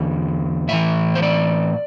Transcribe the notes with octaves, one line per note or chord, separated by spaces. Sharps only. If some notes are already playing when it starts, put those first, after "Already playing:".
Already playing: E2 D3
A2 E3 E5
C5
D5